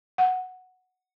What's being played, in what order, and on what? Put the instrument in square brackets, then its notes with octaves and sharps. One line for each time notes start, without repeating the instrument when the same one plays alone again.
[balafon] F#5